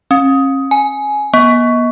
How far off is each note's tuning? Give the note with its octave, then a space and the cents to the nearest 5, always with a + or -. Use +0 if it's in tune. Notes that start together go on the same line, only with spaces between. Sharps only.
C#4 -40
G#5 +15
B3 -40